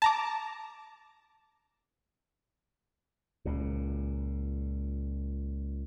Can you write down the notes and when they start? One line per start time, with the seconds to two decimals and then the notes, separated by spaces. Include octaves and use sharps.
0.02 A5 A#5 D6
3.45 C#2 A#2